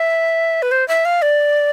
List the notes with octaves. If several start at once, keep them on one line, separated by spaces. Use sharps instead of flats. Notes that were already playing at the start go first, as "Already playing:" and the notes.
Already playing: E5
B4
C5
E5
F5
D5